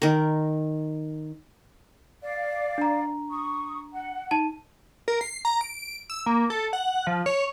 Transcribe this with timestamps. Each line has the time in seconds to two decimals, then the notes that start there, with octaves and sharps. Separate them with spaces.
0.02 D#3 A#4
2.22 D5 F5
2.78 D4 A#5
3.30 C#6 D#6
3.93 F#5
4.31 D#4 A5 D#7
5.08 A#4
5.21 C7
5.45 A#5
5.61 D7
6.10 E6
6.26 A#3
6.50 A4
6.73 F#5
7.07 F3
7.26 C#5